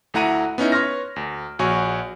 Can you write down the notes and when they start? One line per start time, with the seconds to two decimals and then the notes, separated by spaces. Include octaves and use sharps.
0.14 D2 A3 E4 F#5 A#5 D#7
0.58 B3 C#4 D#4 E4
0.72 B4 C#5 C6 C#6 F6 A#6
1.16 D2
1.59 A#1 F#4 C#5 G#5 C#6